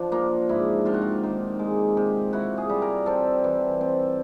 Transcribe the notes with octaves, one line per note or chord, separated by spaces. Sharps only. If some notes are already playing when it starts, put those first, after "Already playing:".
Already playing: F3 D4
A#3 F4
G#2 E4
C3 F4
F#4
F4
D#3
G#3
C3
E4 F#4
G#4
G3
A#4
C4 A4
E3
C4